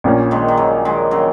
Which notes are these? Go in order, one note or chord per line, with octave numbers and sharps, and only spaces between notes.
A#1 A#2 A#3 C#4
D#3 G#3
D#3
C#3 F#3
D#3 G#3
C#3 F#3